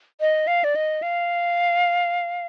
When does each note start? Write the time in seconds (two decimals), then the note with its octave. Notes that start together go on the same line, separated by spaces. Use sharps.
0.21 D#5
0.47 F5
0.64 D5
0.76 D#5
1.02 F5